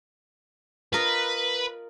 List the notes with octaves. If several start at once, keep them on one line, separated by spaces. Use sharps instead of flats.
F4 A#4 B4 D#5